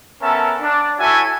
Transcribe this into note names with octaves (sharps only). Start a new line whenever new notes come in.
B3 C#4 A4 A#4 E5 A5
D4
E4 F#4 A4 C#5 E5 G#5